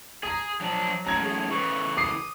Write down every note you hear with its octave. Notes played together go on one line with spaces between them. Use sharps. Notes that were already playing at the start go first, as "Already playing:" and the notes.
G#4 A#5 D#6
F3 F#3 D4
F#2 A2 A#5 G#6
G#4
C#3 E3 C#6
D6 D#6 C7